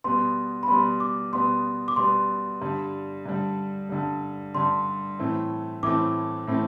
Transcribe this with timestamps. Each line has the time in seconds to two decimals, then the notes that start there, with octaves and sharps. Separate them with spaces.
0.04 B2 G3 B3 C6
0.63 B5
0.68 B2 G3 B3 C6
1.00 D6
1.32 B2 G3 B3 C6
1.88 D6
1.96 B2 G3 B3 C6
2.61 G2 D3 G3
3.26 G2 D3 G3
3.89 G2 D3 G3
4.54 G2 D3 G3 C6
5.19 A2 E3 A3 C4
5.83 A2 E3 A3 C4 D6
6.47 A2 E3 A3 C4